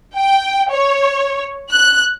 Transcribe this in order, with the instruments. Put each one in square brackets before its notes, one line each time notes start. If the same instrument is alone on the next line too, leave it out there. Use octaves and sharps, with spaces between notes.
[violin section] G5
C#5
F#6